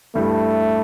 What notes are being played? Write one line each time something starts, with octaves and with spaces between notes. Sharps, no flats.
G2 G3 A3 E4 G4